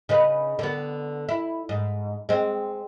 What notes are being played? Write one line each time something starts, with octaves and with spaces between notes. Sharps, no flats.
C#3 D#4 B4
D3 B3
E4
G#2
G#3 C4